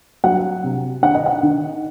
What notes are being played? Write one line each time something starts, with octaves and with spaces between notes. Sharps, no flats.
F#3 F#5
C3
D#3 F#5
D#5
F#5
D#3